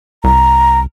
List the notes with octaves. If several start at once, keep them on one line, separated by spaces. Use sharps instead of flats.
C2 A#5